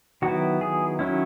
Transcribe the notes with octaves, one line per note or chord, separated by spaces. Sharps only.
D#3 F#3 B3 E4 F#4
G#4
D#3 F#3 C#4 E4